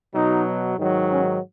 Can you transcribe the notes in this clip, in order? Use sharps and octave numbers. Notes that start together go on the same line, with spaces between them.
B2 F#3 D#4
G#2 D#3 F#3
C#4